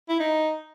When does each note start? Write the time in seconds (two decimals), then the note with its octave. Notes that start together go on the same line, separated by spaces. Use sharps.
0.09 E4
0.20 D#4